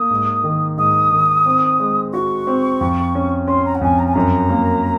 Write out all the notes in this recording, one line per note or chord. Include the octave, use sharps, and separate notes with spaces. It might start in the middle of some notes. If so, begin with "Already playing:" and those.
Already playing: A#3 D#6
G#2
D#3
G#2 D#6
D#3
C4
G#3
F#4 C#6
C4
F2
C#4
C#4 C6
A#5
F#5
F2 G#5
A#5
G#5
F#2 A#5
A#3